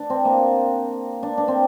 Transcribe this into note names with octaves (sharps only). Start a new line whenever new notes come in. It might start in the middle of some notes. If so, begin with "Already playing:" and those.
Already playing: D4
C4
A#3
D4
D4
C4